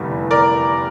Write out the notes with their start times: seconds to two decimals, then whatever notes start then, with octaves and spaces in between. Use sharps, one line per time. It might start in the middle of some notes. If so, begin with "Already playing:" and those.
Already playing: F1 E2 D3 G3
0.31 A#4 D5